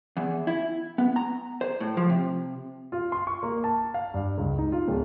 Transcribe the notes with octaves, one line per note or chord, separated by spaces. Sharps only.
E2
E4
B3
A#5
C5
A2
F3
C3
F4
C6
C#6
A#3
A5
F5
G2
C#2
D#4
F4
D1